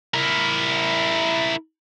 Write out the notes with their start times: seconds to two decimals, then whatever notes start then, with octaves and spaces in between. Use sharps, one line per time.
0.14 E4 A#4